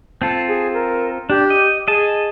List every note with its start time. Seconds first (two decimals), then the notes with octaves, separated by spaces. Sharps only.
0.22 C4 F4 A4 A5
0.48 G#4
0.74 A#4
1.30 D4 G4
1.50 D#5
1.88 G#4 D#5 A5